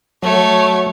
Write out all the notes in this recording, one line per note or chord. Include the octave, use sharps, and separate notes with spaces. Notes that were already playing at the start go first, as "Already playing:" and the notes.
F#3 A3 C#5